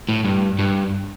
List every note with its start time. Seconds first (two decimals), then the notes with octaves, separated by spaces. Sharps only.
0.09 A2
0.25 G2
0.59 G2